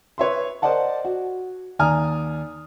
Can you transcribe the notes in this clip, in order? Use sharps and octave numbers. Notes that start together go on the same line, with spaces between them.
B4 C#5 E5 C6
A#4 C5 D5 D#5 F#5 A5
F#4
D#2 D5 G#5 A#5 D#6 F6